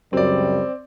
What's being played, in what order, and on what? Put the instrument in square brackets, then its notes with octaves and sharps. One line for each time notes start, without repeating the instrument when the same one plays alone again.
[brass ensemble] C#2 F#2 G3 [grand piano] C4 D5